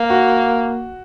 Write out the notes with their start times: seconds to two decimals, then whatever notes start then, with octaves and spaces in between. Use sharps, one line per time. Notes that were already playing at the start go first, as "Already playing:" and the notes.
Already playing: A#3
0.10 F#4